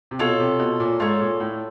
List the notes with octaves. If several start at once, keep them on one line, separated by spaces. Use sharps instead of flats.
C3
B2 F4 A4 C#5
C3
B2
A#2
G#2 F4 A4 C#5
A#2
A2